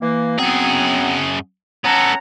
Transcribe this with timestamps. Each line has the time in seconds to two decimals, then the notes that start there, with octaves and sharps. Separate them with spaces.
0.02 E3 A#3
0.39 F#2 F#3 B3 C4 G#4
1.85 B3 C#4 A4 F#5 A#5